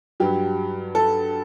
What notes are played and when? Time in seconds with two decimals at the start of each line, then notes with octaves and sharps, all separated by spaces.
0.20 G2 F#3 G4
0.95 A4